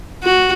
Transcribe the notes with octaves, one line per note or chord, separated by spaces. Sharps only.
F#4